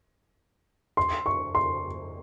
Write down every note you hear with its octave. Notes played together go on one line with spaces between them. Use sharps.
C6
C#6
C6